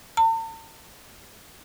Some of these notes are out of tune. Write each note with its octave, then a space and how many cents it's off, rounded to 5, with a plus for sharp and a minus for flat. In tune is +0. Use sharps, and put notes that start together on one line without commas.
A5 +45